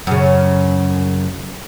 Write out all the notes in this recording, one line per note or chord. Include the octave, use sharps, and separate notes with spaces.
F#2 C#3